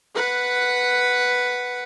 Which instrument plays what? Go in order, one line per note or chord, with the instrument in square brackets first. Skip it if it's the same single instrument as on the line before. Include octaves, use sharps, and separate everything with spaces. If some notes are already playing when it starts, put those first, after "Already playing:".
[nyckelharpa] B4 F#5